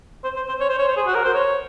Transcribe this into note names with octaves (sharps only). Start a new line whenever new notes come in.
C5
C5
C5
C#5
C5
C#5
C5
G#4
F#4
A#4
C5
C#5